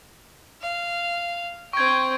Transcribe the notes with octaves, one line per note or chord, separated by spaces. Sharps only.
F5
C4 G5 C#6 G#6